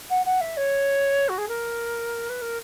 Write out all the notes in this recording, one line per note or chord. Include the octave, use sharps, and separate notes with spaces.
F#5
F#5
E5
C#5
F#4
G#4
A#4
B4
A#4